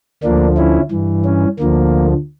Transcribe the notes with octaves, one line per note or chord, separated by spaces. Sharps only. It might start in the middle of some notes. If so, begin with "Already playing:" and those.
D2 D3 F3 A#3 D4
C#4 E4
G2 E3
C#4
D2 D3 F3 A#3